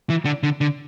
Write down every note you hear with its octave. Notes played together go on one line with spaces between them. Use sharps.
E3
D3
D3
D3